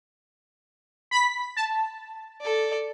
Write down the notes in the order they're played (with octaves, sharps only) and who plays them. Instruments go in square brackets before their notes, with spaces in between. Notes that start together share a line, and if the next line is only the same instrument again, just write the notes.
[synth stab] B5 B6
A5
[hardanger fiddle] A4 D5